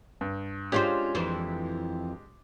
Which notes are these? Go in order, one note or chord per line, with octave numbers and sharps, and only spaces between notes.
G2
G#3 C#4 D4 F4 G4 C5
F2 E3 C5